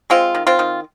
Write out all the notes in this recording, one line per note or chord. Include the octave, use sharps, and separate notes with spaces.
G#3 C4 F4
D#3
C4 F4
D#3